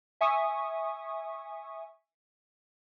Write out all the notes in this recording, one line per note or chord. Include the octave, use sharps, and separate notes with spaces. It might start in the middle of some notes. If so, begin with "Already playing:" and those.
E5 G#5 C#6 D#6